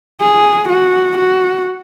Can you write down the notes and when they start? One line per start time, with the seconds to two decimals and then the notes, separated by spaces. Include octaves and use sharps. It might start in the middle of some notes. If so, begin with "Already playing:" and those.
0.21 G#4
0.70 F#4
1.18 F#4